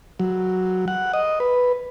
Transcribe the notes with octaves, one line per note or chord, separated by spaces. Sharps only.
F#3
F#5
D#5
B4